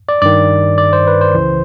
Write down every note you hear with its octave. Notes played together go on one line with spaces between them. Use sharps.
D5
G2 D#3 D5
D5
C5
B4
C5
C#2 C#3 E3